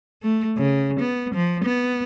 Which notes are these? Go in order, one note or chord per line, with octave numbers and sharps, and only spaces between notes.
A3
C#3
B3
F3
B3